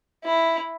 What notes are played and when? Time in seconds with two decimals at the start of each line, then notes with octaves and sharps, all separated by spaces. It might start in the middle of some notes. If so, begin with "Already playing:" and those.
0.25 E4